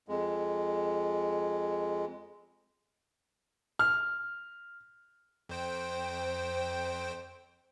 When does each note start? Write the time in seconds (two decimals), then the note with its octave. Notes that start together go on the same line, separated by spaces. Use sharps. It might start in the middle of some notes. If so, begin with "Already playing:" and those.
0.08 F2 G#3
3.79 F6
5.49 F2 C5 G5